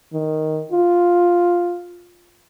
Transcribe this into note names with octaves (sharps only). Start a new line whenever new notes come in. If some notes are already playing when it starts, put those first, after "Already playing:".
D#3
F4